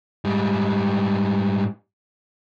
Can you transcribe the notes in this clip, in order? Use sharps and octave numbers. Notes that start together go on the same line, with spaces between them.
G#2 G3